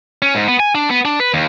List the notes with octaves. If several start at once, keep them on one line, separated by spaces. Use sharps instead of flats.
C#4
G#2
B3
G#5
D4
B3
D4
B4
D#2